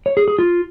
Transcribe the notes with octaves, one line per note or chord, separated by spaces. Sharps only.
C#5
G#4
G#4
F4